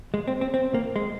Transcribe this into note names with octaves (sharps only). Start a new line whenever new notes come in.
G#3
C4
C4
C4
A#3
G#3